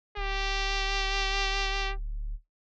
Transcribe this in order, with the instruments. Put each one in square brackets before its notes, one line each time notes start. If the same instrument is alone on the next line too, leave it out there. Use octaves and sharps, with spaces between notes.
[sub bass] D1 [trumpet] G4